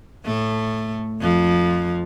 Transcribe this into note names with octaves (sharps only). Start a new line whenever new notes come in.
A2 A3
F2 F3